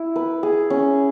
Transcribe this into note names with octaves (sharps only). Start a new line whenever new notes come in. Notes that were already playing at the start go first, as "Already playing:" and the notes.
Already playing: E4
B4
G#4
C#4